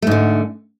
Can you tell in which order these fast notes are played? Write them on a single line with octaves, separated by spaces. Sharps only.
A3 G#2 D3